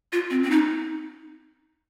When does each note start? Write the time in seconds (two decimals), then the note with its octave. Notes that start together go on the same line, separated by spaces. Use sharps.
0.13 F4
0.30 C4
0.43 C4
0.51 D#4